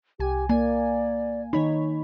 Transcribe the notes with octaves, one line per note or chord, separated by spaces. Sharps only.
C2 G4 G#5
A#3 D5 G#5
D#3 D#4 C#5 B5